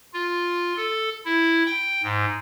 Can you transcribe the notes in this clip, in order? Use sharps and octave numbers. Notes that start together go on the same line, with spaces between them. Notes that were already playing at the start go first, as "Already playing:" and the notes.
F4
A4
E4
G5
G#2